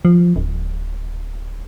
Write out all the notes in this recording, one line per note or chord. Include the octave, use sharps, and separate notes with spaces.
F3
D1